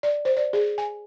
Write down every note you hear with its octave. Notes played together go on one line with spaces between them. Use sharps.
D5
C5
D5
G#4
G#5